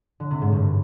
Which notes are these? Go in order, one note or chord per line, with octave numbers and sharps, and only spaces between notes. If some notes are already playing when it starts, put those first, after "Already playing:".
D3
C3
G#2
G2